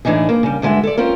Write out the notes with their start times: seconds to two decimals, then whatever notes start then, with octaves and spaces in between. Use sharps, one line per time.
0.05 A2 E3 D4 D#4 G#4
0.29 A#3
0.43 C#3 G3
0.62 G2 D3 G#3 F#4 E5
0.83 A4 D5
0.97 C4 C#4 F4 A#4